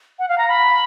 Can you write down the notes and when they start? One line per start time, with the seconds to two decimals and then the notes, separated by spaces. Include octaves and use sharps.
0.19 F#5
0.29 F5
0.38 A#5
0.48 B5